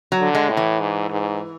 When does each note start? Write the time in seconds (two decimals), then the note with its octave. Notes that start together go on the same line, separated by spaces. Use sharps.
0.12 F#3
0.20 D3
0.35 G#3
0.49 A2
0.57 E3
0.80 G#2
1.09 G#2